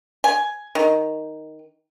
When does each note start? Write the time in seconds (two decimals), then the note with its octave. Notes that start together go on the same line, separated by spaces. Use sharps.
0.24 G#5
0.75 D#3